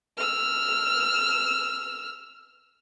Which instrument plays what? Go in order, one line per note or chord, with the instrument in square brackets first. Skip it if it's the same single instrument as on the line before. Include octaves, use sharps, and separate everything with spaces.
[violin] E6 F6